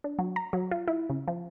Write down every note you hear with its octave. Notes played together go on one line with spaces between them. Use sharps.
D4
F#3
A#5
F#3
F4
E4
C#3
F3